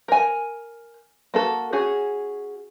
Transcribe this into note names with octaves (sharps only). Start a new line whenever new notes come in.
A#4 G#5
A#3 F#4 A4
C#4 F#4 G#4